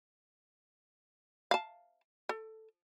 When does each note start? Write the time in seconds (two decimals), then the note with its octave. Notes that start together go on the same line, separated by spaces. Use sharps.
1.51 F5 A5
2.29 A4